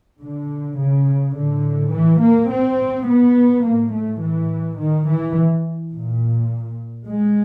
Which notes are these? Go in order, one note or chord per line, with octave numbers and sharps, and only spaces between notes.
D3
C#3
A2 D3
E3
A#3
C4
B3
A2 A#3
A3
E3
D#3
E3
A#2
G#3